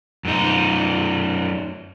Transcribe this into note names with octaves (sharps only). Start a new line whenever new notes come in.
F#2 D#4